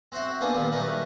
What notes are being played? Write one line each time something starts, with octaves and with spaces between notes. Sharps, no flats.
C4 F#4 C5 E5 F#5
A#3 B3 D4 G#4 A4 B4
G2 A#2 D#3 G3
F#3 G3 A3 D#4 A#4 B4